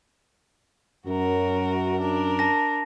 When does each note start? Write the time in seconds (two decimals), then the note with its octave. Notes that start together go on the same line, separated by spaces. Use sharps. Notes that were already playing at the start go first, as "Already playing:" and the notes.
1.07 F#2 F#4 A#4
2.00 D4 A#4
2.39 A5 A#6